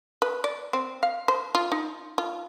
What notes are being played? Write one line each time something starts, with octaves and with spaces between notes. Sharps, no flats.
B4
D5
C4
F5
C5
F4
D#4
F4